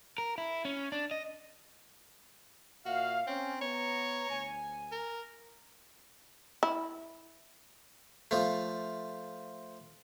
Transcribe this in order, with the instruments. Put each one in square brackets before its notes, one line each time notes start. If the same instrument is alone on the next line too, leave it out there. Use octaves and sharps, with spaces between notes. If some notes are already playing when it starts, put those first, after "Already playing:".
[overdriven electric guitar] A#4
E4
C#4
D4
D#5
[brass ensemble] A#2 E5 F5 [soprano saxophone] F#4
[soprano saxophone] C4 [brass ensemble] C#4
[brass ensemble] B3 A#5 [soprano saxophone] C#5
[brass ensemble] D2 G#5
[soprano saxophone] A#4
[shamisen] E4
[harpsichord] F3 A3